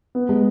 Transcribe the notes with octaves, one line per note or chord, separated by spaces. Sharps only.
B3
G#3